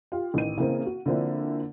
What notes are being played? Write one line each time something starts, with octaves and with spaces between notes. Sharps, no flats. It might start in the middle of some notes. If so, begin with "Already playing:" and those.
F4 G4
A1 D#3 D#7
C#3 E3 A#3 C4
F#4
D3 F3 A#3 C4 D4 E4